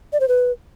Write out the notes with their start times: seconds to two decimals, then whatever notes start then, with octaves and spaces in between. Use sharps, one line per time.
0.13 D5
0.21 C5
0.28 B4